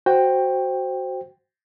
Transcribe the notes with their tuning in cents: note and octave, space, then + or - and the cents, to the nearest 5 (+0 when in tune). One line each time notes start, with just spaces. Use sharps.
F#4 +10 C5 +0 G5 +10